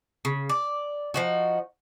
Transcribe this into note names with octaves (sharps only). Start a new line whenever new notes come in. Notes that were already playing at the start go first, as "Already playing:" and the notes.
C#3
D5
F3 D#4 F#4